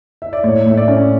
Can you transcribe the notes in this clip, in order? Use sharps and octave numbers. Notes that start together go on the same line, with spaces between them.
E5
D5
A2 C#5
A2 E5
D5
C#4